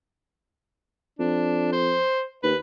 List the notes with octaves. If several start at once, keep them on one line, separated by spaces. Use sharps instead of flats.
F2 D4
C5
D#2 B4